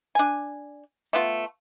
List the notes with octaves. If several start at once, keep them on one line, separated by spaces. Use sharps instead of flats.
D4 G#5
A3 B3 F4